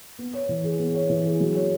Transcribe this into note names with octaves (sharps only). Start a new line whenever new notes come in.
B3
C#5
E3
G#4
B3
C#5
E3
G#4
F#3
C#5